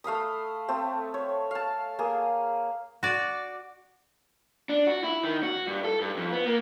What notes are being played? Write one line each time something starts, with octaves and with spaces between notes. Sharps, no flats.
A3 F5 B5 D#6
A3 C4
C#5
F5 A5
A#3 G#4
F#4 D5
D4
F#4
E4
D#3
F#4
G2
A4
G2
F2
B3
A#3